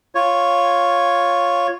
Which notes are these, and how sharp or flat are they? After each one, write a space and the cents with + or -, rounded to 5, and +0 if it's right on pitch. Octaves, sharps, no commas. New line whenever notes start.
F4 +5 C#5 +0